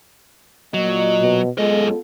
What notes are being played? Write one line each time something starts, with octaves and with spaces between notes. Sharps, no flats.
A#2 F#3 D#5
B2
F#2 G#3 B3 F4 A4 D#5